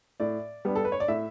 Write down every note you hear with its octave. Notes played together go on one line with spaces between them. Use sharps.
A2 D5
G3 B3 D4
A4
B4
C#5
D5
A2 E5